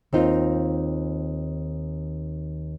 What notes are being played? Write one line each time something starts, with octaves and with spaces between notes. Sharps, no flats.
D#2 C4 D#4 F4